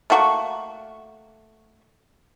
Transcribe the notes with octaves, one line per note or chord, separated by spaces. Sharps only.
A3 A#3 F#4 C#6